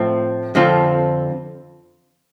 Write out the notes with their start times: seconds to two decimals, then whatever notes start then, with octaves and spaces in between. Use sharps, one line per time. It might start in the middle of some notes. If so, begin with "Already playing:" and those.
Already playing: A2 F3 C4
0.55 F2 D3 F3 C4 F4